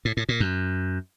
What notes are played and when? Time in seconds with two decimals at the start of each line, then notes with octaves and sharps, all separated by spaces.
0.05 A2
0.17 A2
0.29 A#2
0.40 F#2